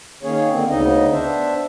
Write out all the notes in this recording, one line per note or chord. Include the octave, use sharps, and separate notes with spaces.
D#3 A#3 C#4 G#4 C#5
D3 A#3 C4
D2 C#3 B3 D#4 D#5
B3 D4 C5 E5